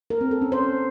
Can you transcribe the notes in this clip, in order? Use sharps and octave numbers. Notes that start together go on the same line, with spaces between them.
A#4
C4
A4
C#4
C5